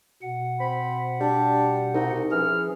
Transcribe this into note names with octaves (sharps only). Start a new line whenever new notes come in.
B2 F#5
C4 B5
G3 D4
C2 D#4
E3 F3 C#4 G#4 F6